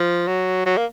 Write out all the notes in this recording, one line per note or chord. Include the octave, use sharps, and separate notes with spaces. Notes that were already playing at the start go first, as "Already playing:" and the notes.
Already playing: F3
F#3
F#3
A#3